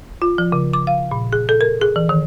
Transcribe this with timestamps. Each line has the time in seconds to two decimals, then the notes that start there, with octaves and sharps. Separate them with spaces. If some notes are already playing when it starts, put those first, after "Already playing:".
0.22 F4
0.38 F3
0.52 C#3
0.73 D6
0.87 F5
1.11 A#2
1.33 G#4
1.49 A4
1.61 A#4
1.81 G#4
1.96 E3
2.09 D#3